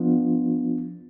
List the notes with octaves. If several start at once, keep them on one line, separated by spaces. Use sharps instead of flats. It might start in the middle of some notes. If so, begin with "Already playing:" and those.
Already playing: F3 B3 D4 F4